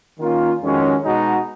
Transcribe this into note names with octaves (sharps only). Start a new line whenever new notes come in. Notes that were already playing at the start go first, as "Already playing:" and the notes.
D#3 A#3 C#4 F4 A#4
F2 D#3 G#3 C#4 F#4
B2 G#3 D#4 F#4